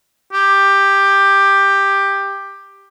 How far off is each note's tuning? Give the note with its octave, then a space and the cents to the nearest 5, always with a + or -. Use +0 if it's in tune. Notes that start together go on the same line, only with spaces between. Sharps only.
G4 +10